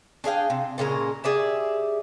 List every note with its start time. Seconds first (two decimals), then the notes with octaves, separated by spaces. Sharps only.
0.24 D4 G#4 F5 G5
0.50 C3
0.78 A#2 C#3 G#3 A#4
1.24 G4 G#4 D5 E5